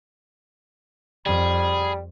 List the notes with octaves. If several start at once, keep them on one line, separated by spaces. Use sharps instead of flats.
F2 G3 G#4 B5